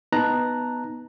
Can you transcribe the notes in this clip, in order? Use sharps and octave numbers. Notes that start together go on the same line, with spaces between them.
B3 D#4 A5 A#5 F#6